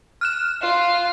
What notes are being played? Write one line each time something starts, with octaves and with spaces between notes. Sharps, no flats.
F6 F#6 E7
F4